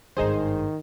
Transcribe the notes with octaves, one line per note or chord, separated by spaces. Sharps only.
G#1 G2 D#3 D#4 G#4 C5